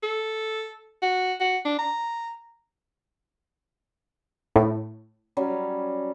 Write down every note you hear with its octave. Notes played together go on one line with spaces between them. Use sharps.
A4
F#4
F#4
D4
A#5
A2
F#3 G3 C#4